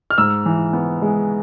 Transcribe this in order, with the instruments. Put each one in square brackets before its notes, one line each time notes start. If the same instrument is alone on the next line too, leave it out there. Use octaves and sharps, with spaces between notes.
[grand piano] F6
G#2 E6
E3
B3
G#3